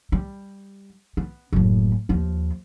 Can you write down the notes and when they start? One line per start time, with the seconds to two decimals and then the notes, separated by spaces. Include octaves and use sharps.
0.12 G3
1.17 B3
1.53 F#1 A2
2.09 D#2 F3